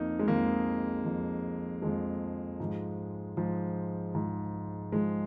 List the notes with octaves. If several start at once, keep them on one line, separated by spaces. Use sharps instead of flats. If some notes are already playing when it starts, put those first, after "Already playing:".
Already playing: F2 F3 A#3 D#4
G#3
F2 F3 A#3
F2 F3
F2 F3 G#3
G#2 F3
G#2 F3
G#2 F3
G#2 F3 G#3